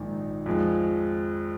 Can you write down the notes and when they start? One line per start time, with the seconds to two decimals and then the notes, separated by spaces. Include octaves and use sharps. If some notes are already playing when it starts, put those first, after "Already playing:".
Already playing: A#1 G#2 D#3
0.46 F2 F3 G#3